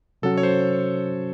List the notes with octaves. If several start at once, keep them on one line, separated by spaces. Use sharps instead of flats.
C3 F#3 C#4 F#4 A4
C#5
C5